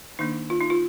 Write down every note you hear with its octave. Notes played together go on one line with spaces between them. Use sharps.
D#3 A#3 D4 D#4
F4
D#4
F4